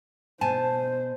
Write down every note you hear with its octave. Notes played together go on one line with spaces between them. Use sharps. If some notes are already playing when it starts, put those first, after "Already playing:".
B2 C5 G#5 A5